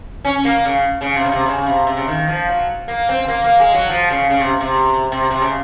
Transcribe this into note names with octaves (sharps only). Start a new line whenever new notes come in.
C#4
A#3
C#3
C#3
C3
C#3
C3
C#3
C3
C3
C#3
D#3
F3
F#3
A#3
C4
C4
A#3
A#3
G#3
F#3
F3
C#3
C#3
C3
C3
C3
C3
C#3